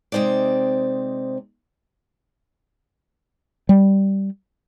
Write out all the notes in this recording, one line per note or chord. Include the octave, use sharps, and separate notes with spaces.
C3 G#3 C4 D#4 D5
G3